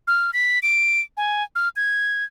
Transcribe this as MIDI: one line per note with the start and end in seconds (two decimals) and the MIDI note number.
0.07 0.31 89
0.33 0.59 95
0.63 1.01 98
1.17 1.43 80
1.55 1.69 89
1.76 2.24 92